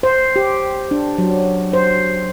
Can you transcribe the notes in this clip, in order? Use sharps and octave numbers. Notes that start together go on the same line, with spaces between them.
C5
G4
D4
F#3
C5